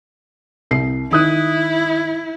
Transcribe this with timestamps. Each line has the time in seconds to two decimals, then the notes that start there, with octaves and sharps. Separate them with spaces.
0.71 C2 C7
1.11 D#3 E4 D#6 F#6